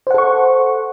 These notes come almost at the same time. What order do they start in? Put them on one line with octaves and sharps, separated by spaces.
C5 F#5 A4 C#6